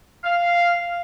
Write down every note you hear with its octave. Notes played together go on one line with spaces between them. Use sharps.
F5